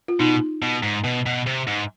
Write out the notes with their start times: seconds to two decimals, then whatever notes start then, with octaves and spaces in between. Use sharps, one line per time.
0.08 F4
0.20 B2 D#4
0.62 B2
0.83 G#2
1.04 B2
1.26 B2
1.47 C3
1.68 G#2